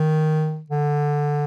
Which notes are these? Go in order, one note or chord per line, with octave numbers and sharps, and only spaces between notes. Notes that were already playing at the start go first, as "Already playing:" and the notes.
Already playing: D#3
D3